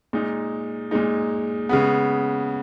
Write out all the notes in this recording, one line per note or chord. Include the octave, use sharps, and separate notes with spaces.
A#2 G#3 D#4
A#2 G#3 D#4
C#3 G#3 B3